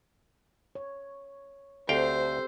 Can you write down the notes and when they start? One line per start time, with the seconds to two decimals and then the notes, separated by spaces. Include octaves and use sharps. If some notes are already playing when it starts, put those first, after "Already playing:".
0.75 C#5
1.89 D2 C4 G4 A4 C5 F5 G5